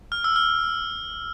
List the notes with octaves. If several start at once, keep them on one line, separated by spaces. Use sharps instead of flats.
F6
E6
F6